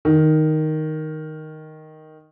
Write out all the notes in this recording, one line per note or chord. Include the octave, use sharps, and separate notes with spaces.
D#3